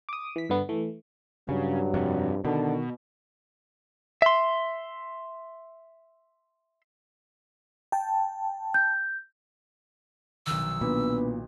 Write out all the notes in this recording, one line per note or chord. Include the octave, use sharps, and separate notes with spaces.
D6 D#6
E3 B6
G2 D3 B3
E3 A3
G2 C#3 F#3
F2 C3
B2 D3 D#3
E5 C6
G5 A5
G6
B1 D#3 E6
A#2 B3 D4 B4